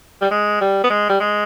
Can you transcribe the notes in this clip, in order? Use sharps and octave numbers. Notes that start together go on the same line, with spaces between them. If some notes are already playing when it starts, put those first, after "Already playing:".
G3
G#3
G3
B3
G#3
G3
G#3